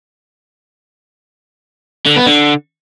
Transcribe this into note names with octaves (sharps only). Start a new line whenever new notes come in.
D3
B3
D3